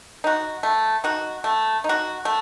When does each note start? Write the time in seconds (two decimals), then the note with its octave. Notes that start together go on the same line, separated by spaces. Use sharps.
0.24 D#4 F#4
0.63 A3
1.04 D#4 F#4
1.44 A3
1.84 D#4
1.89 F#4
2.25 A3